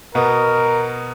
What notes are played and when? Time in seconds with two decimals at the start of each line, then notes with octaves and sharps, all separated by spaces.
0.14 B2 B3 A#4